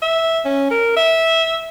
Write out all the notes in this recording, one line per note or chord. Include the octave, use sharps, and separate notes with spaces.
E5
C#4
A#4
E5